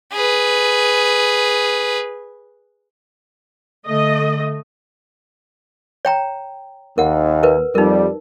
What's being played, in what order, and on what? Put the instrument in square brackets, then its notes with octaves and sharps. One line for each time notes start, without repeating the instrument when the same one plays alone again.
[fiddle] G#4 B4
[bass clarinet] D3 [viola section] A3 D#5
[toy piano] C#5 G5 A#5
[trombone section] D#2 [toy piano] A#4 F#5
[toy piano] A#4 B4
[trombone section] F2 G3 [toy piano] D#4 A#4